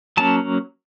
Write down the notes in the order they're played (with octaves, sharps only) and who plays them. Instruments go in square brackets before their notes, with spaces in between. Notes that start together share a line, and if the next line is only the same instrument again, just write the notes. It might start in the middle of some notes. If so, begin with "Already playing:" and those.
[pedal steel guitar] F#3 A#3 C#4 A5